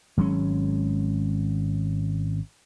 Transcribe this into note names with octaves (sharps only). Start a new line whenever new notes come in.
G#1 F#3 G#3 C#4